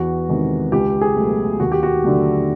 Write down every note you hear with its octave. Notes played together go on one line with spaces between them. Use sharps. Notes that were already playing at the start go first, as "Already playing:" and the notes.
Already playing: E2 F#4
C3 D#3 G#3
C#2 G4
G#4
B2 F#3 A3
D#2 F#4
G4
F#4
D3 F#3 A3